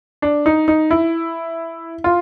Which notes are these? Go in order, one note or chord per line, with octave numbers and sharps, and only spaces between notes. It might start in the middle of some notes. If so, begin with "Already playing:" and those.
D4
D#4
D#4
E4
F4